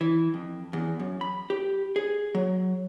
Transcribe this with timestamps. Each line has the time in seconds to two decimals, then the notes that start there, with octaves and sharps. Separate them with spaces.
0.01 E3
0.34 F2
0.73 E2
0.99 F#2
1.21 B5
1.50 G4
1.96 G#4
2.35 F#3